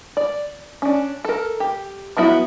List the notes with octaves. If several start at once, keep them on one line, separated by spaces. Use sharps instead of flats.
D5
C#4 D4
A4 A#4
G4
F3 F#3 B3 E4 F#4